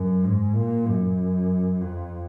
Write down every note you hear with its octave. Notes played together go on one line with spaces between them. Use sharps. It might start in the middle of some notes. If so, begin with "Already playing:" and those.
Already playing: F#2
G#2
A#2
F#2
F2